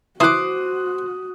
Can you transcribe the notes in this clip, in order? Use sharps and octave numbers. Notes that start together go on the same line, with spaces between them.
E3 F#4 C5 D6 D#6 F#6